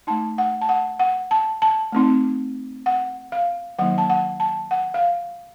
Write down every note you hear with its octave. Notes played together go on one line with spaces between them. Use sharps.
A3 D#4 A5
F#5
A5
F#5
F#5
A5
A5
A3 C4 D#4
F#5
F5
D#3 F#3 A#3 D#4 F#5
A5
F#5
A5
F#5
F5